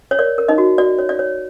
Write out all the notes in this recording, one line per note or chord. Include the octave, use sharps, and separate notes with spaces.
C#5
A#4 D5
A#4
D#4 D#5
F#4
F#4 D5
C#5
D5
C#5